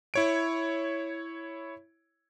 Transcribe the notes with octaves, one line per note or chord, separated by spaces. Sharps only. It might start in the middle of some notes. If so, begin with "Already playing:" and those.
E4 C#5 D7